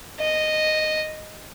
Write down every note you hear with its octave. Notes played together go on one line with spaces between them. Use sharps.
D#5